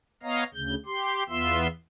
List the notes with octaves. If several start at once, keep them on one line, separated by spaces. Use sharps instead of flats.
B3 C#5 D#5 F5 A#5
D2 C#3 G6
G4 C6
E2 B3 F4 E5 C6 E6